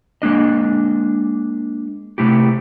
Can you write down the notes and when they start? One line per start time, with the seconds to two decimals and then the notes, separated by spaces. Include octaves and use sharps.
0.22 G#3 A#3 D4 D#5
2.18 C3 A3 E4 G4